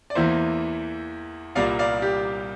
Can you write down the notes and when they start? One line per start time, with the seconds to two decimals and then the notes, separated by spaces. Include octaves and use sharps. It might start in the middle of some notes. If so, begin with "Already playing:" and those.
0.10 D5
0.15 E2 E3 A#3 C5 E5
1.55 C2 A#2 G3 A#3 D5 F5
1.79 D5 F5
2.02 G4